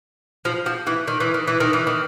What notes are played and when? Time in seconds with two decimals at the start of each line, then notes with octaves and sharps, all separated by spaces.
0.45 F3
0.66 F3
0.87 E3
1.08 D#3
1.20 E3
1.34 D#3
1.47 E3
1.60 D#3
1.73 E3
1.87 D#3